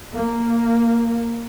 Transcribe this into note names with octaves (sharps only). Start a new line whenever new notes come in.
A#3